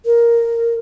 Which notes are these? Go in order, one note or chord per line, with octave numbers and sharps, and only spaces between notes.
A#4